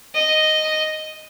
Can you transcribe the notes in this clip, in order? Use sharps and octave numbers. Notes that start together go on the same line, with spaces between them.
D#5